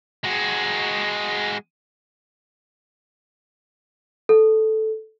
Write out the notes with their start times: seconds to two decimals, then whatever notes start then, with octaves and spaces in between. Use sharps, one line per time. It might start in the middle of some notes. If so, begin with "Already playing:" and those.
0.24 G#3 F#4
4.29 A4